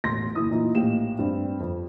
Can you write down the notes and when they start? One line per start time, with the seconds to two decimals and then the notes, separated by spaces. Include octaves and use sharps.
0.04 E1 A1 C6 A#6
0.35 F#1 E4 D#6
0.49 A#2 E3 D#4 F4
0.75 A#1 A2 G4 F5 E7
1.19 G2 C4
1.60 F2